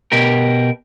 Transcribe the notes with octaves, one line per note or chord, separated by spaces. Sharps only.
B2 G4 A#4